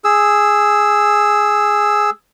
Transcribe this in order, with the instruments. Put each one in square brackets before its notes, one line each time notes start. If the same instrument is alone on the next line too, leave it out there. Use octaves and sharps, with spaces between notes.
[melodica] G#4 E6